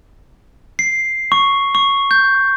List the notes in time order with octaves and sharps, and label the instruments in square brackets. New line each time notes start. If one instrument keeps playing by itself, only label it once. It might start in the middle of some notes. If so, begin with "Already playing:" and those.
[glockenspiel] C7
C#6
C#6
G6